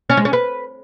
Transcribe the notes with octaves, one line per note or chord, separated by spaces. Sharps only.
C#4
G#3
C#4
B4